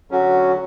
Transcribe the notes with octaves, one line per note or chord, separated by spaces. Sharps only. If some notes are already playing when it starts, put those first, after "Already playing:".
D3 F#3 C#4 F#4